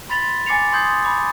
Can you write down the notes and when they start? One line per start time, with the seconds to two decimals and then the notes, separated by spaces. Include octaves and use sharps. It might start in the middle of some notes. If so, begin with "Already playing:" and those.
0.09 B5 C6 A6 B6 F7 G7
0.46 G#5 D6 A6 C7 C#7 F7
0.72 C6 D#6 G6 G#6 C7
1.04 B5 D6